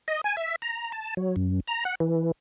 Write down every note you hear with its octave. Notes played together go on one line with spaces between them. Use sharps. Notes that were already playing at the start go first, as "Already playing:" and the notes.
D#5
G#5
E5
A#5
A5
F#3
F#2
A#5
F#5
E3